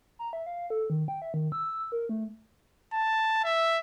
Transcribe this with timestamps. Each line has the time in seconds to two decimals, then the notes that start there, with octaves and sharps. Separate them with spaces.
0.19 A#5
0.33 E5
0.46 F5
0.70 A4
0.90 D#3
1.08 G5
1.22 E5
1.34 D#3
1.52 E6
1.92 A#4
2.09 A3
2.93 A5
3.44 E5